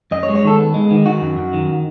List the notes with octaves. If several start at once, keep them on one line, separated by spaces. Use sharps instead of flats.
F#2 D#5
C#5
G#3
C#5
D#3 A4
B3
G#3
D#3
D#3 F#4
F#2
F#2
D#3